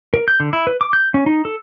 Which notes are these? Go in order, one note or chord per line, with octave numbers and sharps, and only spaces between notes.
A#4
G6
D3
E4
B4
D6
G6
C#4
D#4
A4